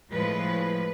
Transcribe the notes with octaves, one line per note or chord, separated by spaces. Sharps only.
A2 F3 G#3 B4